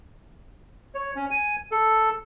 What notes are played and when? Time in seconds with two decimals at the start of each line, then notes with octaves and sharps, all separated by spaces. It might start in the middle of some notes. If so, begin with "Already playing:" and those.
0.95 C#5
1.16 C#4
1.30 G#5
1.72 A4